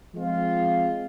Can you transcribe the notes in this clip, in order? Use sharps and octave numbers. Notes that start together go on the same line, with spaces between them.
F3 G#3 C4 F4